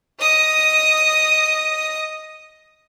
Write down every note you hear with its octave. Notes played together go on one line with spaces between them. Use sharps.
D#5 D#6